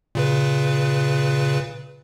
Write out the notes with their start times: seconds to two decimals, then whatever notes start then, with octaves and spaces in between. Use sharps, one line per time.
0.15 A#2 C#3 B4